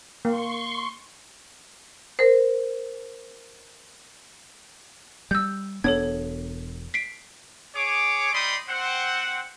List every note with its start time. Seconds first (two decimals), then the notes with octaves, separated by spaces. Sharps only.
0.25 A#3 C6 C#6
2.19 A#4 C5
5.31 G3 E6 G6
5.84 E1 B3 D4 A4 C#5 G#6
6.94 B6 C7 D7
7.76 G#4 C#5 D6
8.34 G3 D#4 D5 B5 C6 D#6
8.69 C4 C5 F#5